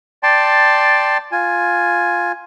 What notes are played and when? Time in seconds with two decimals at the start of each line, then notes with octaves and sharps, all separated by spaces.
0.23 D5 G5 A5 C6
1.32 F4 G#5